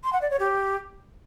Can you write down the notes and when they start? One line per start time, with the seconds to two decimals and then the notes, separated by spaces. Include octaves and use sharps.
0.04 C6
0.13 F#5
0.22 D5
0.31 C#5
0.39 G4